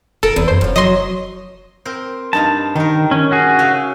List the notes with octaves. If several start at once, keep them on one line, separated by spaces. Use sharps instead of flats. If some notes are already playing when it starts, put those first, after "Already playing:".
E1 A4 A#4
F1 E2
F#2 C5
F1 F#2 F4
F#3 D#5 C6
C4 A#4 C5
G2 D#4 F5 A5
D#3 D#4 A#4
C#4
C#4 F#4 G#4
C#3 E5 F5